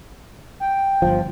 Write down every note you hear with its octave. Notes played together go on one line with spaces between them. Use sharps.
G5
G1 F3